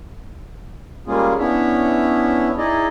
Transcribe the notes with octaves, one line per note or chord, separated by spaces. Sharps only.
G3 G#3 A#3 C#4 F4 G#4
B3 C#4 D4 E4 C#5 E5
D#4 E4 G#4 D5 D#5